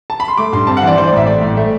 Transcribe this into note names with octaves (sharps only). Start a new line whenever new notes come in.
A5
B5
C6
A3 D6
G2 C6
C4 A5
F#5
E3 D5
E3 C5
D5
A1 E5
A3 D5
A2
A3